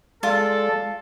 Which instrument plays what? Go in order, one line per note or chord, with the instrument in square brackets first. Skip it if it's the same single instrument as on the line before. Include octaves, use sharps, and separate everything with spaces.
[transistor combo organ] G#3 D5 A5 [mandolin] F4 [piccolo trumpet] A4